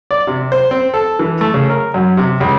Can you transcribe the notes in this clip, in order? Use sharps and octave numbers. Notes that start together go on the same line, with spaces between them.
D5
C3
C5
C4
A4
E3
A3
C#3
A#4
F#2
C3
C#2